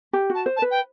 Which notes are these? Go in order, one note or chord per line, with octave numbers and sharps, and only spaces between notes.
G4
F#4 A5
C5
A5
B4
G5